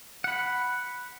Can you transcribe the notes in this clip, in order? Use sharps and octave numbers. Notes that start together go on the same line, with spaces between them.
F#5 B5